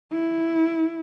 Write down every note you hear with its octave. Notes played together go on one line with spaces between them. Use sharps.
E4